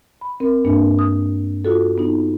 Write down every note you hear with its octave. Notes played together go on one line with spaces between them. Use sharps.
B5
C4 A#4
G2 A#3 D4
D#6
F4 F#4 A4
B3 D#4